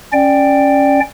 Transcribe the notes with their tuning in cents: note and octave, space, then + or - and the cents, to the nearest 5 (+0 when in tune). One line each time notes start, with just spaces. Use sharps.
C#4 +0 D5 +10 G5 +0